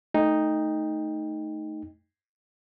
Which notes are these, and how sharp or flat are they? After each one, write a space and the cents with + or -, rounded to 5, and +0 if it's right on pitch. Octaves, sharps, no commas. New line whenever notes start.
A3 -10 D#4 +0 G5 +25